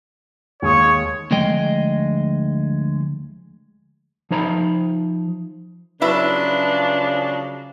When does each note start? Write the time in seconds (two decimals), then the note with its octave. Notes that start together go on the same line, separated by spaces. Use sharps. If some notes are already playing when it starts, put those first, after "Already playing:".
0.62 D#2 G#3 C#5 D#6
1.31 D2 F3 G#3 G#4 D#5 G5
4.31 F3 D#4 C5 A#5 B5
6.01 C#3 F3 F#3 G#3 D4 E4 B4 E5